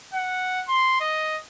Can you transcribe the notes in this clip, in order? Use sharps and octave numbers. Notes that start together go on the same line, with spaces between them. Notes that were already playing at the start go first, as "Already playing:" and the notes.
F#5
C6
D#5